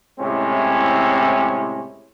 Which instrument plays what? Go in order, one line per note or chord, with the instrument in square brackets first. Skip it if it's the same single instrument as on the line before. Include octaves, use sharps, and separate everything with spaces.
[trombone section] A2 C3 G#3 C4 C#4 E4